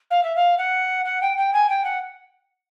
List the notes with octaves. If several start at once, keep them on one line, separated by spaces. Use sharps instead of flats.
F5
E5
F5
F#5
F#5
G5
G5
G#5
G5
F#5